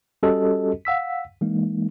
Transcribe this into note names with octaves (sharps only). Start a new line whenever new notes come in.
G3 C#4 F#4 G4 A4 D#5
F5 F#5 E6 B6
E3 G#3 A#3 D#4